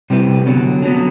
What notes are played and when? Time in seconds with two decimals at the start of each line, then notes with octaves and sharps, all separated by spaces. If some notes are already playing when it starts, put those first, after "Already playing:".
0.10 C3 G3 C4 E4 B4
0.46 D3 F#3 B3
0.82 D3 F#3 B3